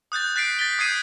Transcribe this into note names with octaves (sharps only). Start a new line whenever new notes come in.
D#6 F#6 G6 A6
F#6 A6 B6 C7 D7
A6 B6 G7
D#6 G6 G#6 C7 D#7